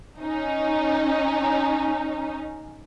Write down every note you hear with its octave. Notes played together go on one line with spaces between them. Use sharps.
C#4 D#4